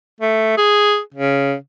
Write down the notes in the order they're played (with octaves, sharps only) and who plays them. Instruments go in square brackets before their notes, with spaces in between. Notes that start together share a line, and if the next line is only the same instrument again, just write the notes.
[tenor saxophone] A3
G#4
C#3